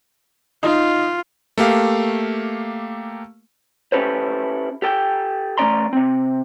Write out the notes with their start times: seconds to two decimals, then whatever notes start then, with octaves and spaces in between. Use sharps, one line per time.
0.63 D#4 F4
1.58 A3 A#3 G4 F5
3.92 C#4 E4 G4 A4 B4 C5
4.82 G4 A4 G5
5.58 E2 A3 C#4 D5 A#5 C6
5.93 C3 C4